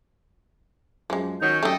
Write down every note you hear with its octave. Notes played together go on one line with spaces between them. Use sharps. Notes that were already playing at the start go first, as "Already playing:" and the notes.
F#2 F3 G#3
D#3 F#3 C#4 D#4 G6
F#2 G3 A3 A4 D#5 G5